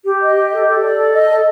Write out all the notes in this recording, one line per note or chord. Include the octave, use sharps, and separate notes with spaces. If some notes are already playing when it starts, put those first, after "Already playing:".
G4
D#5
G4
A4
A4
D5
A4
D#5
A4